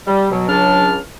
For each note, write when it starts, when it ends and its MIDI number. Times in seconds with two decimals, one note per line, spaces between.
0.07 0.29 55
0.32 0.47 47
0.32 0.47 54
0.48 0.97 37
0.48 0.97 49
0.48 0.97 54
0.48 0.97 62
0.48 0.97 81
0.48 0.97 89